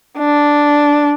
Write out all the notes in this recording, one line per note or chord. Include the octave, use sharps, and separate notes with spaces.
D4